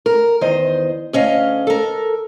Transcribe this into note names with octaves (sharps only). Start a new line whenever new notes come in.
A#4
E2 D#3 C5 D#5
D2 C#4 D#5 F5
A4 A#4